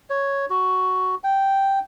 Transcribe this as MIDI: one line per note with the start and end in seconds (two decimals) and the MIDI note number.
0.10 0.45 73
0.50 1.15 66
1.24 1.79 79